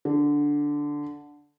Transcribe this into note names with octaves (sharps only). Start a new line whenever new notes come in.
D3